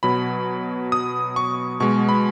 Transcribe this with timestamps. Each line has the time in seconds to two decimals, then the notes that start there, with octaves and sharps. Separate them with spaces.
0.03 B2 F#3 B5
0.92 D#6
1.36 C#6
1.80 B2 G#3 C#6
2.09 B5